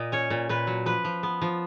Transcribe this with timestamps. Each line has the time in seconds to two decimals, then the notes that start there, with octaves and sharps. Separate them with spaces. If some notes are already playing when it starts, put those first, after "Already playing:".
Already playing: A#2 D#5
0.12 C#4 C#5
0.30 A#2
0.49 A#2 B4
0.67 F#3
0.86 F3 B4
1.04 F3
1.23 B3
1.42 F3